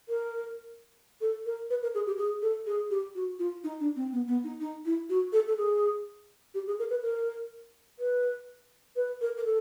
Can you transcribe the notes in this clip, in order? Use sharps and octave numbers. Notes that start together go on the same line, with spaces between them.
A#4
A4
A#4
B4
A#4
G#4
G4
G#4
A4
G#4
G4
F#4
F4
D#4
D4
C4
B3
B3
D#4
D#4
E4
F#4
A4
A4
G#4
G4
G#4
A#4
B4
A#4
B4
B4
A#4
A#4
A4